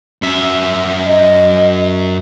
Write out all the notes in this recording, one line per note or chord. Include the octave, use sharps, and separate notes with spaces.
F#2 E5
D#5